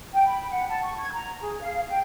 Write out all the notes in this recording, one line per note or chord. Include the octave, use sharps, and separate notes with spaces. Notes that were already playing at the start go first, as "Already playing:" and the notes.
G5
B5
F#5
A5
C#6
G#6
A#5
G#4
F5
G5